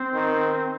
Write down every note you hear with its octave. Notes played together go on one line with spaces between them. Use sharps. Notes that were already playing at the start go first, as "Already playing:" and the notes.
Already playing: C4
D#3